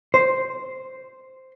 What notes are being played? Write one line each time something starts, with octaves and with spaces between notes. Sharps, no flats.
C5